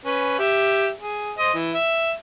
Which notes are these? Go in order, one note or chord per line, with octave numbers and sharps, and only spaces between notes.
C#4 B4
G4 E5
G#4
C5 D#5
E3
E5